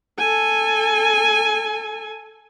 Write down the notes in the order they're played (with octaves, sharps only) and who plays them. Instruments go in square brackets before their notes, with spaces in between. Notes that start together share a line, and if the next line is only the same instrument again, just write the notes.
[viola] A4 G#5